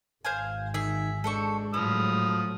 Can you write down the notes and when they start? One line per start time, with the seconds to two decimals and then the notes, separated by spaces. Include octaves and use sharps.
0.25 G#1 C5 F5 G#5
0.74 D#3 G#4 E5
1.24 G#3 D4 A4 C5 C#6
1.74 A2 F3 F#3 E4 D#6 F6